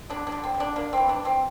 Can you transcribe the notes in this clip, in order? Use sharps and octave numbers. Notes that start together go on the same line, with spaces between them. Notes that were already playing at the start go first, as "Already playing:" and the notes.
D3 D4
D4
D3
C4
D3
D4
A#3 D4
E3 C4
D4
E3
C4